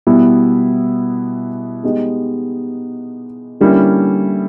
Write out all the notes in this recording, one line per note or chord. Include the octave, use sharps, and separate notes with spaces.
B2 G3 B3 E4
G#3 B3 D#4 G4
D3 G3 A#3 C#4 E4